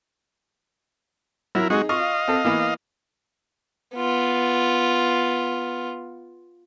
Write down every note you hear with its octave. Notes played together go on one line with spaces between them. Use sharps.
F#3 E4 A#4
G#3 D#4 F#4 G#4
F4 D#5 F5 C#6
C4 A4
E3 A#3 B3
B3 F4